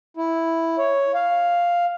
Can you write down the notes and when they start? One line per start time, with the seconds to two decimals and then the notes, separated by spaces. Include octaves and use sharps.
0.17 E4
0.78 C#5
1.14 F5